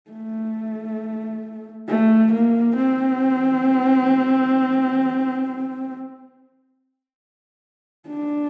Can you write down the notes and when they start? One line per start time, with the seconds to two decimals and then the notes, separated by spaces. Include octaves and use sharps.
0.11 A3
1.88 A3
2.32 A#3
2.76 C4
8.08 D4